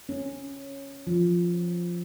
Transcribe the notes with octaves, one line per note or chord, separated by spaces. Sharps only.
C#4
F3